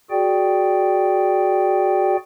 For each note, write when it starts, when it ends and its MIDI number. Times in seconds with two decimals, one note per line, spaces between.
0.10 2.16 66
0.10 2.16 68
0.10 2.16 74
0.10 2.16 79